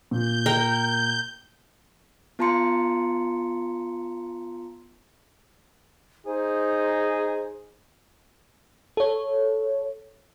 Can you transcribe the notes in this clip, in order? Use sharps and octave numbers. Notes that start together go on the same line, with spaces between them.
A#2 G6
A#4 G5
B3 F4 A5 A#5 C6 C#7
D#4 G#4 C5
A4 C#5